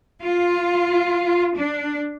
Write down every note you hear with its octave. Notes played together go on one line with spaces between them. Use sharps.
F4
D4